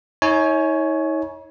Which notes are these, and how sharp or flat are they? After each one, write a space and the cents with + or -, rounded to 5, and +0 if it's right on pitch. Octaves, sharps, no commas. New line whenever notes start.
D#4 +45 C#5 +0 G#5 +25